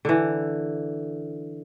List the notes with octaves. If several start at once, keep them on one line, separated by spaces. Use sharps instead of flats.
D3 E3